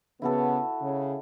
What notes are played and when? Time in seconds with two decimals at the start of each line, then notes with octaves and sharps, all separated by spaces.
0.22 C#3 B3 E4 F#4 A4
0.81 C#3